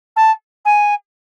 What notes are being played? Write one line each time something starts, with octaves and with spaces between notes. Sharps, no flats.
A5
G#5